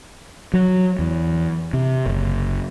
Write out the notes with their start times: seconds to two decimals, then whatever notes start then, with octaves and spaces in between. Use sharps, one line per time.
0.54 F#3
0.99 E2
1.73 C3
2.06 F#1